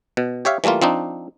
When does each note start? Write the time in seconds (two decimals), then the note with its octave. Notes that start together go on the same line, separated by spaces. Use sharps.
0.17 B2
0.45 G4 C#5 E5 F5
0.64 E3 G3 A3 A#3 F4
0.82 F3 C4 D4 D#4